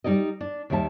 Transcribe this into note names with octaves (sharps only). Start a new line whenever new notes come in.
G3 D#4 G#4 D5 D#5
D4
D#2 D#3 G3 E5 A5